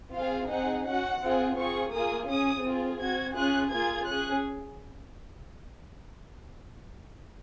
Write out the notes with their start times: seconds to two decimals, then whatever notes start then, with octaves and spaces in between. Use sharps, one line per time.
0.15 C4 F4 G#4 F5
0.51 C4 D#4 G#4 F#5
0.86 C#4 F#4 F#5
1.22 C4 F4 G#4
1.58 C4 F4 G#4 C#6
1.94 A#3 F4 G#4 D#6
2.28 C#4 G#4 D#6
2.64 C4 F4 G#4
3.00 C4 F#4 G#6
3.35 C#4 F4 G#4 F#6
3.71 A#3 F4 G#4 G#6
4.06 C#4 G#4 F#6